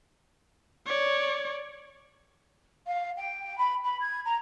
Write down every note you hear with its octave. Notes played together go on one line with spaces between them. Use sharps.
C#5 D5
F5
G5
B5
B5
G#6
A#5